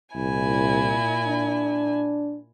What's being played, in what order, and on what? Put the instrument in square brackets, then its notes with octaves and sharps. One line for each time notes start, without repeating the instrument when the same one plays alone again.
[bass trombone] C2 [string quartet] A#2 E4 G#5
[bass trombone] D4